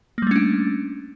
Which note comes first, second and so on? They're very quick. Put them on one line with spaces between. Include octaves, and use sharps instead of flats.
A#3 G3 A3 C#4 D4